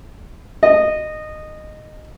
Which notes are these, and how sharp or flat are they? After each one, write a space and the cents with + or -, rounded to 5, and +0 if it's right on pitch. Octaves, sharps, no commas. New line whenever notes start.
D#5 -15